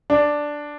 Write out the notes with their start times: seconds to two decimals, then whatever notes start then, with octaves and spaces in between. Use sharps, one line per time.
0.10 D4